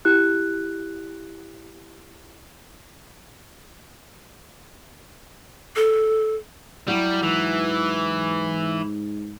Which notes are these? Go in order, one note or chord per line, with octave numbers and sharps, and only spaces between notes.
E4 G4 F#6
A4
F#3 G3 E4 F#4
G#2 E3